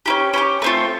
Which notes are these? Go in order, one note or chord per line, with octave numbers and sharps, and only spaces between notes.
C#4 E4 G4
C#4 E4 G4
A3 C4 F4